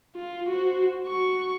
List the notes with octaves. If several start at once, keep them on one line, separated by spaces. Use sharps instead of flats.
F4
F#4 C5
F#4 C#6